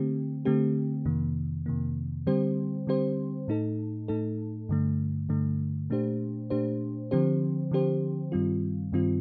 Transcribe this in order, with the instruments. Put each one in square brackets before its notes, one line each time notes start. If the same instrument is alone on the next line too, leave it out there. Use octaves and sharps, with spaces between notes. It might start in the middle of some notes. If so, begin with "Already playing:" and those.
Already playing: [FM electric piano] D3 A3 C4 G4
D3 A3 C4 G4
F2 C3 D#3 A#3
F2 C3 D#3 A#3
D3 G3 C4 G4 C5
D3 G3 C4 G4 C5
A2 A3 D#4 A4
A2 A3 D#4 A4
G2 D3 A3
G2 D3 A3
A#2 A3 D4 G4 C5
A#2 A3 D4 G4 C5
D3 F3 C4 G4 C5
D3 F3 C4 G4 C5
G2 D#3 G3 C4 F4
G2 D#3 G3 C4 F4